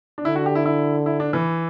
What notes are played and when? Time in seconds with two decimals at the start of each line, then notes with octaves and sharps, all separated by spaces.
0.18 D4
0.25 D3 E4
0.36 F#4
0.46 G4
0.55 E4
0.66 E4
1.06 E4
1.20 D4
1.33 E3